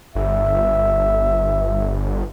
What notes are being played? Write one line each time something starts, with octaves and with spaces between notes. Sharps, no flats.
G1 E5